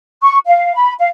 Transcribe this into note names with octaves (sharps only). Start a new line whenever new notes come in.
C#6
F5
B5
F5